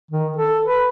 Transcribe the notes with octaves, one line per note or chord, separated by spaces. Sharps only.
D#3
A4
B4